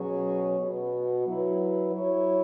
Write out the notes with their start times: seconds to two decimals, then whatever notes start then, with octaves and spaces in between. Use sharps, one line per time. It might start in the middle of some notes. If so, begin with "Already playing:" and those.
Already playing: B2 F#3 C#4 G#4 C#5
0.57 B2 B3 F#4
1.25 F#3 E4 B4
1.92 F#3 E4 C#5